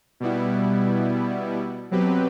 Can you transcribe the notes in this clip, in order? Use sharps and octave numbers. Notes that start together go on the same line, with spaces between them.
B2 G3 B3 E4
B2 F#3 C4 G4 B4